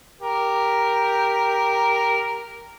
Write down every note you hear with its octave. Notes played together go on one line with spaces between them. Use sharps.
G4 A#4